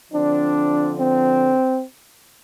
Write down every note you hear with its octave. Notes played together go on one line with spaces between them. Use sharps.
D3 F3 C4 D4
C4